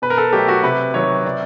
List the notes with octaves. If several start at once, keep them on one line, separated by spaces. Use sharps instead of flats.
B2 B4
A#4
A4
F#3 A3 G4
F#4
C3 B4
D#3 F#3 C#5
C3 D5